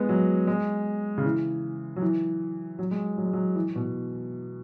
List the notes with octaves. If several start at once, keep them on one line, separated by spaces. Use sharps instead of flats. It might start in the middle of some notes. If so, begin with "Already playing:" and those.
Already playing: G#3 B3
F#3
G#3
C#3
E3
F#3
E3
F#3
G#3
F#3
G#3
F#3
E3
B2